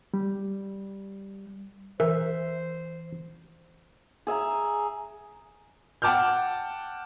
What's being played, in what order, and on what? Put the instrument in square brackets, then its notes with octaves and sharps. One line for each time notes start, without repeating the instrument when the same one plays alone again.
[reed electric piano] G3
[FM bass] E3 [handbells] A#4 [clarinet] C5 [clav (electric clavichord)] E5
[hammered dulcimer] G#4 E5 G#5 A#5
[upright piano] F#5 G5 A5 D6 F6 G6